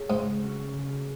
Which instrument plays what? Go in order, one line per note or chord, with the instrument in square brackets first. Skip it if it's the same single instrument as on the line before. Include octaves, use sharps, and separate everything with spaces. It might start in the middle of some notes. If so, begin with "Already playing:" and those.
Already playing: [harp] A3 D#4 G#4 C#5
[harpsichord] G#2 [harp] C#3
[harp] F#3 A3 C#4 F#4
C#3